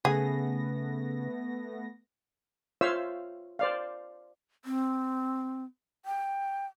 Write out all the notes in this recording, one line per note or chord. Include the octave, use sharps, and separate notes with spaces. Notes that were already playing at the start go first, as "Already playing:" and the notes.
C#3 A3 B3 G#4 A#6
F4 C5 C#5 E5 F5 E6
C5 D5 F5
C4
G5